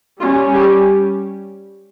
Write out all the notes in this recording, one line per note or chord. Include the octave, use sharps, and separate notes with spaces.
G3 C#4 F4
G3 G4